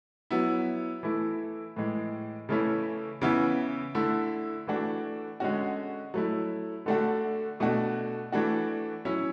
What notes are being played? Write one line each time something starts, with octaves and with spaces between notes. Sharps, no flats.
F#3 B3 E4
E3 A3 E4
A2 E3 G#3
C#3 E3 A3 C#4 E4
C#3 E3 B3 E4
D3 A3 E4
E3 A3 D4 F#4
D3 G#3 C#4 F#4
F#3 A3 E4
D3 A3 D4 F#4
B2 A3 D4 F#4
E3 A3 D4 F#4
F#3 C#4 E4